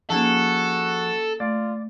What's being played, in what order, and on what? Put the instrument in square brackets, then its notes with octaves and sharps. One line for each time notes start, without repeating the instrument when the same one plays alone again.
[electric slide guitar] F3 G#4 [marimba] A#3 C#4 D#4 [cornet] F#4 [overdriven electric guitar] A4
[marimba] A3 [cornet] F4 [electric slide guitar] D5